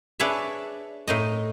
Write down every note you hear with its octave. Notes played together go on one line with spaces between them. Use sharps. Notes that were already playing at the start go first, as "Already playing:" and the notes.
D4 G#4 B4 C#5 E5
A2 D#4 D#5